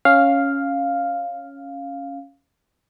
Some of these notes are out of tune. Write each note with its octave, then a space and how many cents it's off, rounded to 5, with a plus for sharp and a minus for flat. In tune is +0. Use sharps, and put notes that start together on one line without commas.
C#4 +0 F5 +0